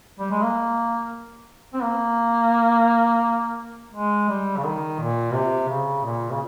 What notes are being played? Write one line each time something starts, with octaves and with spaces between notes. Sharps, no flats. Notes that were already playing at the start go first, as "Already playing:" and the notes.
G3
G#3
A#3
C4
A#3
G#3
G3
C#3
D#3
A#2
C3
C#3
A#2
C#3